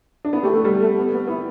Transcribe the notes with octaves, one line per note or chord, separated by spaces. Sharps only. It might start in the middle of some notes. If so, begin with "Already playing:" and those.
D4
B3 E4
A3 G4
A3 A4
G3
A3
B3
B3
B3 E4